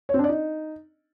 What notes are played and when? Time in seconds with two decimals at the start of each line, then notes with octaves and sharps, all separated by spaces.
0.09 C#5
0.14 C4
0.19 D4
0.24 D5
0.29 D#4